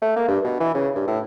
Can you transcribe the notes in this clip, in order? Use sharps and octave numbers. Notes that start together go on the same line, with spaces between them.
A3
A#3
G2
B2
E3
C#3
G2
A2